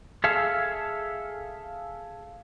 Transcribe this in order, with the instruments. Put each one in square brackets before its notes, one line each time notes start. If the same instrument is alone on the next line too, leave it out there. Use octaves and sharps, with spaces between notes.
[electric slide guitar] G#4 A4 E5 F5